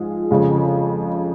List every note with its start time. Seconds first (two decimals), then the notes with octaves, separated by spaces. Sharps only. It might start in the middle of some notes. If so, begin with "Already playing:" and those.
Already playing: G#2 F3 G#3 F4 G#4
0.31 F2 C#3 G#3